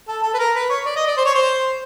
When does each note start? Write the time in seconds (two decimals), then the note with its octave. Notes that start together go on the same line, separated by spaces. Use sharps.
0.08 A4
0.23 A4
0.34 B4
0.39 A#4
0.55 B4
0.70 C#5
0.86 D5
0.96 D#5
1.07 D5
1.17 C5
1.26 C#5
1.35 C5